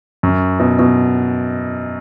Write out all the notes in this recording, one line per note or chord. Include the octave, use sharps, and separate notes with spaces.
F#2
B2
B2